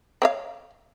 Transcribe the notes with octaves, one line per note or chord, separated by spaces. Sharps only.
C4 C#5 F5